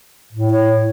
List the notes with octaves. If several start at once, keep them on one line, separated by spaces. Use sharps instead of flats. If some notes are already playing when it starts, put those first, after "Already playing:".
A2
C#5